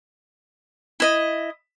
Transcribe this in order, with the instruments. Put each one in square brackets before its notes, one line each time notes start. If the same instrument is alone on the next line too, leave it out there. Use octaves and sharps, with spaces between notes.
[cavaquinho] E4 D#5